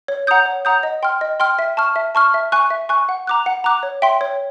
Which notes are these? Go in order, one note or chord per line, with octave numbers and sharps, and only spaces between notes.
C#5
F#5 A#5 D#6 G6
C#5
F#5 A#5 D#6 G6
D#5
G5 C6 F6
D#5
G5 C6 F6
E5
A5 C#6 F6
E5
A5 C#6 F6
E5
G#5 C#6 F#6
E5
G#5 C#6 F#6
F#5
A#5 D6 F#6
F#5
A#5 D6 F#6
C#5
E5 G5 C6
C#5